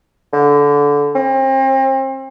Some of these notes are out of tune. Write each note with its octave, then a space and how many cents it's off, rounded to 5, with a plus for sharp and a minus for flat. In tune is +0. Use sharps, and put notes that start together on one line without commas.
D3 -20
C4 +35